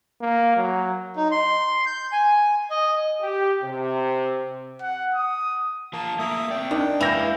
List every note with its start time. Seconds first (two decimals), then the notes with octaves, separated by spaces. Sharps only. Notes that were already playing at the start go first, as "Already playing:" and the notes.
0.21 A#3
0.57 F#3
1.16 D#4
1.31 C6
1.86 G6
2.12 G#5
2.70 D#5
3.21 G4
3.63 C3
4.82 F#5
5.15 D#6
5.93 F3 F4 A#4 A5
6.19 A3 A#3 A#4 E5 D#6
6.50 C4 D5 G5
6.71 D#3 D4
7.00 E3 G#3 A#3 E4 F5 G6 A#6 F7